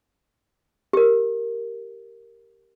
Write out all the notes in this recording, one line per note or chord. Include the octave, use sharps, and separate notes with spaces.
G4 A#4